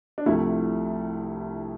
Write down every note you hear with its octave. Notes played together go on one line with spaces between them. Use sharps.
D4
C2 C3 F3 A3 E4